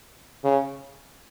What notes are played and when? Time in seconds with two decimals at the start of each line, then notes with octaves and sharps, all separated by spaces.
0.44 C#3